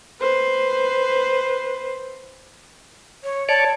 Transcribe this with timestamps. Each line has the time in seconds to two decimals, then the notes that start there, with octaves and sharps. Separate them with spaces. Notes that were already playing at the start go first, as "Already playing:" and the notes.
0.21 B4 C5
3.24 C#5
3.49 C#5 D5 A5